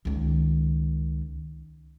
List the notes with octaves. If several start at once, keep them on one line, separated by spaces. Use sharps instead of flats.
C#2 D#3